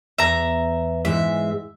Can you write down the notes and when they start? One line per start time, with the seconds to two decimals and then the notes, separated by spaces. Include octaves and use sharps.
0.18 E2 E5 A#5
1.05 G#2 E3 G#3 E5